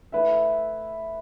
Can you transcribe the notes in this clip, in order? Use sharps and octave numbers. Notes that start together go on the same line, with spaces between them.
A3 E4 B4 E5